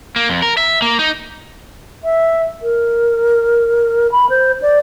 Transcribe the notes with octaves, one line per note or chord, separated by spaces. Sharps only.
A#3
F2
A#4
E5
A#3
D#4
E5
A#4
B5
C5
D5